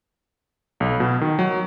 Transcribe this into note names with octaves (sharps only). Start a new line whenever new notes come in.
B1
B2
D#3
F#3